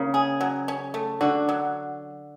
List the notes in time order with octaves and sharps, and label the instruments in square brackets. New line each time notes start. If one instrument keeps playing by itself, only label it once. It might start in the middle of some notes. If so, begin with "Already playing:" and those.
Already playing: [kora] C#3 [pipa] A#3
[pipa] G#4
F#3
C#4
A3
[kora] D3 [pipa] F#4
[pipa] F#3